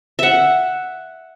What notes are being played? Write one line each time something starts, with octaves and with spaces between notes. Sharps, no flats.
E5 F#5